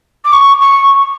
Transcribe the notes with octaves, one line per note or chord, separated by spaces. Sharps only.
D6
C#6
C#6